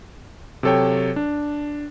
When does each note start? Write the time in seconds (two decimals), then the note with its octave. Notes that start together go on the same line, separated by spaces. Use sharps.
0.63 C3 F#3 A4 C#5 G5
1.16 D4